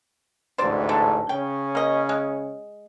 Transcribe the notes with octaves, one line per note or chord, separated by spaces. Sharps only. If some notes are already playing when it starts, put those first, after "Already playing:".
A1 D2 G#2 C5 D5
D3 D4
C#3 C#4 G5
A#3 D#5
G#3